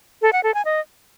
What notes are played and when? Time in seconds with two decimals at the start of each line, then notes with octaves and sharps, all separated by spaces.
0.22 A4
0.33 F#5
0.43 A4
0.54 G#5
0.65 D#5